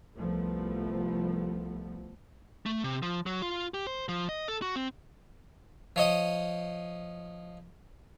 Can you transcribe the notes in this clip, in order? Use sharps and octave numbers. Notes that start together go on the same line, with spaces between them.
C2 F3 A3 B3
A3
C3
F3
F#3
F4
G4
C5
F3
D#5
A4
F#4
C4
F3 C#5 D#5 D#6